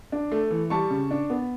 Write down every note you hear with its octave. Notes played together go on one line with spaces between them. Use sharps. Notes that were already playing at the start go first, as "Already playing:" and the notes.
D4
A3
E3
G3 A5 C#6
C#3
D4
B3